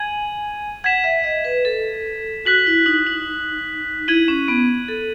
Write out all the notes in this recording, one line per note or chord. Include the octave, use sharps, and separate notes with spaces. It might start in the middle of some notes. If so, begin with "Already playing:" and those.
Already playing: G#5 G#6 D#7 F#7
F#5 G#6 B6 E7
E5
D#5
B4
A4
F#4 F#6 B6 F#7
E4
D#4
D#4
E4 G#6 D#7 F#7
C#4
B3
A4